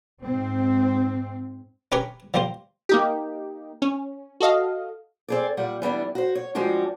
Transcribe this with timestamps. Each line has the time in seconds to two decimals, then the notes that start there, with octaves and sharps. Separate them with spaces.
0.23 G#2 C4
1.92 C#4 G4 A#4 B4 G#5 C#6
2.34 F3 G3 A#3 F4 C5
2.89 A#3 D#4 G4
3.82 C#4
4.40 F#4 A4 D#5 F5
5.28 C4 G#4 D5
5.57 A#2 G3 F#5
5.82 E3 G3 B3 D4
6.15 F#4 C5
6.35 C#5
6.55 F3 G3 G#3 D4 F#4 G4